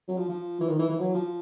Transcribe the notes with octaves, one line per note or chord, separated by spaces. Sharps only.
F#3
F3
F3
E3
D#3
E3
E3
F#3
F3